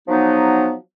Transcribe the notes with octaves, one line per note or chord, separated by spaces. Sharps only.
F3 F#3 B3 D#4